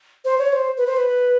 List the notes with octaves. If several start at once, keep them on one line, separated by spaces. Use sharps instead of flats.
C5
C#5
C5
B4
C5
B4